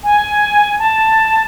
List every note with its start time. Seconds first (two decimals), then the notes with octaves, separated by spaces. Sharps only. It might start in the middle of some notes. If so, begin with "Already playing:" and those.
0.04 G#5
0.79 A5